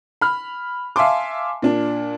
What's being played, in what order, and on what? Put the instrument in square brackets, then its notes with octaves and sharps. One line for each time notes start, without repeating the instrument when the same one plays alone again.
[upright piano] B5 F6
E5 F5 G#5 A5 C6 D6
A#2 D4